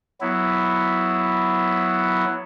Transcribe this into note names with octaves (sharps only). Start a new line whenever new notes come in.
F#3 B3 E4